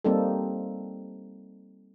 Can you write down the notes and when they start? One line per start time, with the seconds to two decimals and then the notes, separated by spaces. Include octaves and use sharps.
0.05 G3 A#3 C4 D#4 A4